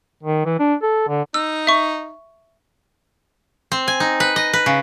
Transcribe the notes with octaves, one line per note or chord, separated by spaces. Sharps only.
D#3
E3
D4
A4
D3
D#4 E6
E5 C#6
C4
G#5
D#4
B4
D#5
B4
C#3